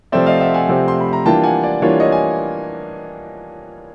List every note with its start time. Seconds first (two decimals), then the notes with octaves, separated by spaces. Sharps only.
0.12 C3 F3 A3 C4 D5 E5
0.26 D#5 F5
0.40 E5 F#5
0.54 F#5 G#5
0.69 C3 F3 A3 C4
0.88 C6
1.00 B5
1.13 A#5
1.25 E3 G3 A#3 D4 F4 G5 A5
1.44 F#5 G#5
1.63 D5
1.82 E3 G3 A#3 D4 F4 C#5
2.00 C#5 D#5
2.12 G#5